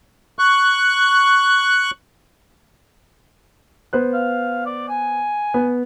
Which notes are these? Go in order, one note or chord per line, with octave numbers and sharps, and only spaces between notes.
C#6 F#6
B3 C5 F#6
F5
D5
G#5
B3